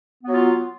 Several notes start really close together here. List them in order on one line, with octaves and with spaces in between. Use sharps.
B3 F#3 F4